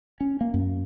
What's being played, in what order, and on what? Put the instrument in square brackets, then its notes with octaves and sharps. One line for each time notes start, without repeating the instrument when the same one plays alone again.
[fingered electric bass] C#4
A#3
F#2